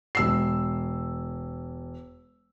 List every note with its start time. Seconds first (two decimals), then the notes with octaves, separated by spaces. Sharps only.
0.15 E1 E6 C7